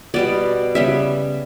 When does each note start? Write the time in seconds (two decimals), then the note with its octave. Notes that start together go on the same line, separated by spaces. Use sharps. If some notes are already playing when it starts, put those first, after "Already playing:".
0.14 B2 G3 B3 D5
0.75 C#3 G3 B3 E5